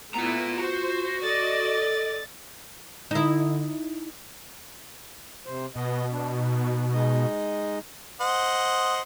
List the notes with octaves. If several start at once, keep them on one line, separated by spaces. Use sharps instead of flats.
A3 B3 E4 F4 A#5 E7
F4 F#4 C5
A4 D5 D#5 A6
D3 D#4 E4
C3 C5
B2 B3 D#5
D4
D#4
G#3 D#4 D#5
C5 D#5 F#5